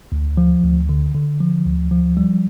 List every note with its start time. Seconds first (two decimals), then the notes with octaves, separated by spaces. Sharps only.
0.12 D2
0.37 F3
0.63 D2
0.89 D3
1.15 D3
1.40 F3
1.66 D2
1.91 F3
2.17 G3